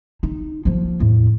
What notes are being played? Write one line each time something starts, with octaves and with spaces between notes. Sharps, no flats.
D#4
F3 A#3
E2 A2